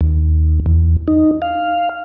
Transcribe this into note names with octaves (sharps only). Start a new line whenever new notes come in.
D#2
E2
D#4
F5